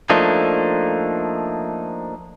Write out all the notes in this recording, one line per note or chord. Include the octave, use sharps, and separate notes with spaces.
F3 A3 A#3 D4 D#4